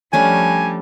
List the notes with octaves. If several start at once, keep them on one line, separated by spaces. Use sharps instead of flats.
F3 G3 A3 C#4 D4 G#5